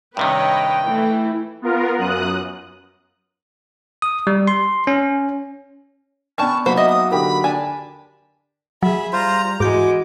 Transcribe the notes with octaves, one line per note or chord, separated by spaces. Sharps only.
G2 C3 D#3 B4 C#5 D#5 G5
E3 A3 E4
B3 F4 A#4
F#2 D#6 F#6
D#6
G3
C6
C#4
B3 C#4 D4 G5 A5 C#6
F#3 A#3 D#4 C5 B5
D#5 E5 D#6
D#6
D3 G4 A#4 B5
D4 G#5
F#3 G#4 E5 B5
G3 F4 C5 A#5
G#2 E3 G#3 F#4 D6 G6